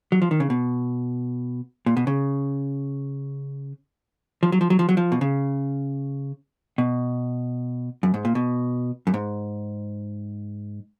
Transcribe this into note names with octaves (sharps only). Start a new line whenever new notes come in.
F#3
F3
D#3
C#3
B2
A#2
B2
C#3
F3
F#3
F3
F#3
F3
F#3
F3
B2
C#3
B2
F#2
G#2
A#2
B2
F#2
G#2